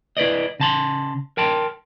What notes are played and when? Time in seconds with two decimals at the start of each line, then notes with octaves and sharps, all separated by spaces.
0.17 E4 B4 D5 D#5
0.60 C#3 A5 C6
1.37 A#4 G5 A5 C6